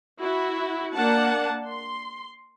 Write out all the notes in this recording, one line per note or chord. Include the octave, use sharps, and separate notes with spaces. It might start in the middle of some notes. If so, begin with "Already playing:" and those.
E4 F#4
A#3 D4 F#5 A5
C6